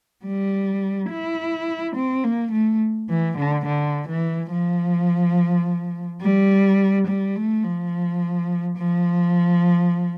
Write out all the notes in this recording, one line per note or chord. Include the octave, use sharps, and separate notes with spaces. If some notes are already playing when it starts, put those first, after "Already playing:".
G3
E4
C4
A#3
A3
E3
D3
D3
E3
F3
G3
G3
A3
F3
F3